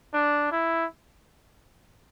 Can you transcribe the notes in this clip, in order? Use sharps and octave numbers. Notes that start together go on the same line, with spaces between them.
D4
E4